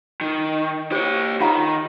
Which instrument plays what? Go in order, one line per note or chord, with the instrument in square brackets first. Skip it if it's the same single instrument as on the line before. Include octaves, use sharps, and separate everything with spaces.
[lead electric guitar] D#3
[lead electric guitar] G4 C#5 [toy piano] C5
[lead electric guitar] D#3 [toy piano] F4 F#5 A#5